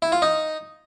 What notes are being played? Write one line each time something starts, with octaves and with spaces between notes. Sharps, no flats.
E4
F4
D#4